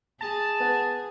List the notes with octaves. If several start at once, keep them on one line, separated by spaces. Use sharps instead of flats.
G#4 A5
B3 B4 F#5